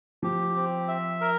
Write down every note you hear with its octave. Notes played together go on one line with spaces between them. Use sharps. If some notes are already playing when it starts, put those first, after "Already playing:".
F3 G4
C4
E5
A#4